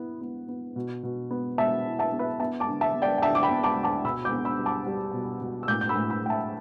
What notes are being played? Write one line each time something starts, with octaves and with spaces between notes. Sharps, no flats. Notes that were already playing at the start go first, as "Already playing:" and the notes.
Already playing: B3 E4
B3
B3
B2
B2
B3
B2 E5 A5
E4
E5 A5
B3
B4 E5
B3 E5 A5
A5 D6
D3
E5 A5
B3
D5 G5
G5
D3 E5 A5
D6
G5 B5
B3
A5 D6
D2
A5 D6
B2 B5 E6
D6 G6
B3
B5 E6
G3
A5 D6
G3
B2
B2
E6
A2 D6 G6
G6
B5 E6
A2
B5 E6
A2 G5
E5 A5